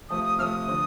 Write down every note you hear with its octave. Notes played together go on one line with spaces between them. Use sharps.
C3 F3 A3 D#6
D#6
C3 F3 A3 D#6 F6
D3 F3